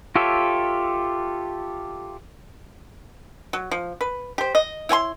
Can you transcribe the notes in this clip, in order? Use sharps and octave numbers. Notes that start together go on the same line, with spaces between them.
F4 G4 A4 C#5 E5
F#3
F3
B4
G4 C5
D#5
E4 C#5 G#5 C6